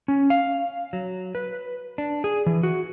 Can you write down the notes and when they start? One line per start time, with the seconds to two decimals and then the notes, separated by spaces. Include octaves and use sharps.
0.08 C#4
0.30 F5
0.93 F#3
1.35 B4
1.98 D4
2.24 G#4
2.46 E3
2.63 F#4